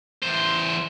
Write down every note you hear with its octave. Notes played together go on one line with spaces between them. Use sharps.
E2 C5